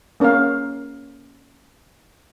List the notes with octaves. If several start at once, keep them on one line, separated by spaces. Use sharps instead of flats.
A#3 C#4 A#4 C#5 F5